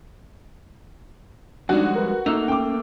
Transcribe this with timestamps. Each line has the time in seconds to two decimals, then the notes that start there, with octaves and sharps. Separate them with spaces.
1.69 F2 G3 G#3 D4 D#4 F#4 D5
1.96 A#4 B4
2.26 A3 A#3 D#4 E6 F7
2.48 C#4 G5 D6